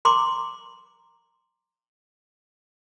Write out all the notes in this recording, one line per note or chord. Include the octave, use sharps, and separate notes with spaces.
A#5 C6 D6